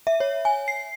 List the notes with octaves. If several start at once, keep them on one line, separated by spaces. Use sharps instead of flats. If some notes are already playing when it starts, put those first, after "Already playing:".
E5
C#5
G#5
C7